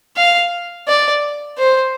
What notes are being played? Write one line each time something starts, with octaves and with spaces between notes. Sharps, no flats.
F5
D5
C5